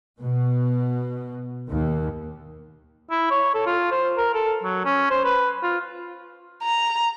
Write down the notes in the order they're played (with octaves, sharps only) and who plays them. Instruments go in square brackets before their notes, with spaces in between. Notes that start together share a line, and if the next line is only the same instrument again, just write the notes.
[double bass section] B2
D#2
[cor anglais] E4
C#5
A4
F4
C5
A#4
A4
F#3
C#4
C5
B4
F4
[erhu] A#5